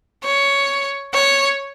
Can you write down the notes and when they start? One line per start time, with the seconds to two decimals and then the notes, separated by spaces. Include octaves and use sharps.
0.24 C#5
1.14 C#5